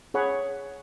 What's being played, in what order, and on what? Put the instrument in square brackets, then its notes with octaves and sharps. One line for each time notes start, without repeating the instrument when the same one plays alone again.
[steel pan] G#4 C#5 F#5 B5